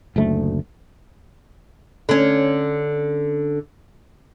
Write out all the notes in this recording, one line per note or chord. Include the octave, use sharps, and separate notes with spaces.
F#1 D2 A3
D3 C#4